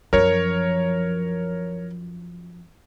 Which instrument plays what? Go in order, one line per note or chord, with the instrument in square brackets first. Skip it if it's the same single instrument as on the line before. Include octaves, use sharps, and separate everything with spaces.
[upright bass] F#2 F3 [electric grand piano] A#4 C#5